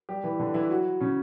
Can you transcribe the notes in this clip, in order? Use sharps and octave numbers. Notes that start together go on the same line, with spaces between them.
G3 G4
E3 E4
D3 D4
E3 E4
F#3 F#4
C#3 C#4